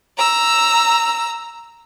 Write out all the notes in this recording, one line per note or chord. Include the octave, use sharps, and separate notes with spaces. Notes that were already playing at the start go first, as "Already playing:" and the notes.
A#5 E6